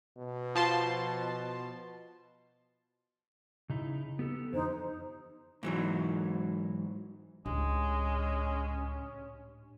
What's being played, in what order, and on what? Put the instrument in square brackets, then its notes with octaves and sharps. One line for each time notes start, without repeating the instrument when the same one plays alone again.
[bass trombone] B2
[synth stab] F3 A5 C6
[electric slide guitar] C#3 D#4 E4
B3 G4 A4
[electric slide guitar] F2 D3 E3 [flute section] D#4 C5
[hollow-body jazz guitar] G#2 E3 F#3
[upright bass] C#2 [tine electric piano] A2 D4 G4 [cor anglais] G#3 [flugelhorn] C#4